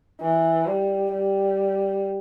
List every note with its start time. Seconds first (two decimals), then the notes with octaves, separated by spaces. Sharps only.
0.21 E3
0.66 G3
1.12 G3